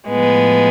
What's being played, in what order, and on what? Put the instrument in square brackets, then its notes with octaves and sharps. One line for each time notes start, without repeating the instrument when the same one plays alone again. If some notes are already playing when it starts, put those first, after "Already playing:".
[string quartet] A2 F3 G#3 B3